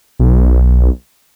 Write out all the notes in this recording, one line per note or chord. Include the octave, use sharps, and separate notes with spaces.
B1